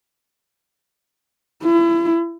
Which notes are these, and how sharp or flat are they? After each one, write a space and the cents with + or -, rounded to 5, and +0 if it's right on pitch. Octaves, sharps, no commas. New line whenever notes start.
E4 +35